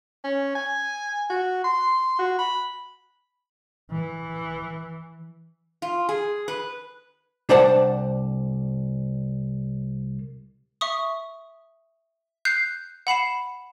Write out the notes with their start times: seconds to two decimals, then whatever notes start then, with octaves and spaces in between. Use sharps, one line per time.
0.24 C#4
0.55 G#5
1.30 F#4
1.64 C6
2.19 F#4
2.39 B5
3.91 E3
5.82 F4
6.09 G#4
6.48 B4
7.49 C2 D4 C5 D5 F#5 A5
10.81 E5 C#6 D#6
12.45 F#6 G6 C7
13.07 F#5 B5 C7 E7